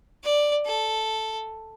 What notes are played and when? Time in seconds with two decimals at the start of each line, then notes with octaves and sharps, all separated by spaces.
0.24 D5
0.65 A4